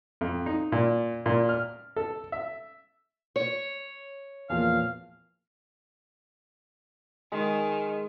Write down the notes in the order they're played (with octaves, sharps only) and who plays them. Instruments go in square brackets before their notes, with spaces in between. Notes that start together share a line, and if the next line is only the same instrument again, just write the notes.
[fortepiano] F2
D#4
A#2
A#2
F6
A4
E5
[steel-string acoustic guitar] C#5
[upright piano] E2 A#2 F3 [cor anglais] F5
[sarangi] D#3 [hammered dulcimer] G#3